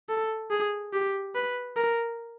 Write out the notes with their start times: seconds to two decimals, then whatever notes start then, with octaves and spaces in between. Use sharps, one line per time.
0.09 A4
0.51 G#4
0.93 G4
1.35 B4
1.76 A#4